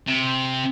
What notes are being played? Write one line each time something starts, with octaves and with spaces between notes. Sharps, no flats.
C3